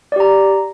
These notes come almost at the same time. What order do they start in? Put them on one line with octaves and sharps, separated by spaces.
D5 G4 A#5